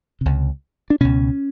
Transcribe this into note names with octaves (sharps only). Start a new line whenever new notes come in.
C#2 C3
D4
C#2 B2 C#4